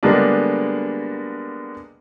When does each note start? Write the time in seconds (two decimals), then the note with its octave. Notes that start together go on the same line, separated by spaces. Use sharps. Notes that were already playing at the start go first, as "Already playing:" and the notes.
0.03 D3 G3 G#3 A#3 B3 D4